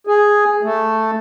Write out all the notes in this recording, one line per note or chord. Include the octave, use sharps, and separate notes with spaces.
G#4
A3